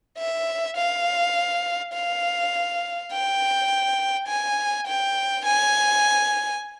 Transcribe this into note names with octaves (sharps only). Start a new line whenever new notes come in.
E5
F5
F5
G5
G#5
G5
G#5